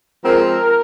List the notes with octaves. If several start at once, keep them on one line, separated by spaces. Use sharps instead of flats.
F3 G#3 C4 A#4